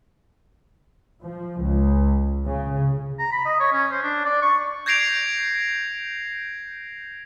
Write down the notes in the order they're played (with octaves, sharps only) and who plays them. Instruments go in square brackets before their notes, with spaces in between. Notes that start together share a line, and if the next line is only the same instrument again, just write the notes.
[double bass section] F3
C#2
C#3
[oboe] A#5
B5
D#5
C#5
C#4
C5
D4
D5
C#6
[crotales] G6 G#6 A#6 C7 D7 F7